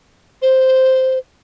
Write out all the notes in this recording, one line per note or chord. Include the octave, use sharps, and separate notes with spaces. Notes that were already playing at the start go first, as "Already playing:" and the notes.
C5